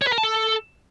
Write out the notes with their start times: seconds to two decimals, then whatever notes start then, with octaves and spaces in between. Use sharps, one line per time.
0.02 C#5
0.07 B4
0.13 A#4
0.18 A5
0.23 A4